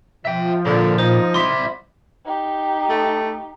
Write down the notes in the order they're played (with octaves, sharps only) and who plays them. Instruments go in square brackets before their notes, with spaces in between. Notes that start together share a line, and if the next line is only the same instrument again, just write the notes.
[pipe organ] F3 [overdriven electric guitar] E5 G5
[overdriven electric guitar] A#2 [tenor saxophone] D3
[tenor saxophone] D#4 [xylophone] C5
[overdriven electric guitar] G3 E4 [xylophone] C6
[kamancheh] D#4 G4
[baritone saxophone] A3